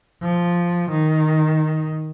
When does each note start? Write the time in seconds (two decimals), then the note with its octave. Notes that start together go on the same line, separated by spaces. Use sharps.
0.23 F3
0.91 D#3